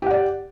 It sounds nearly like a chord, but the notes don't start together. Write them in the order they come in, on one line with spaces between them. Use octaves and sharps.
G4 F#5 D5